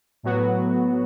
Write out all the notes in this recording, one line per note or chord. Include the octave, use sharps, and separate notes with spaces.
A2 F#3 B3 F#4